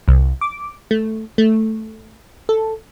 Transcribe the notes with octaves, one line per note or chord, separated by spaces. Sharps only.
C2
D6
A3
A3
A4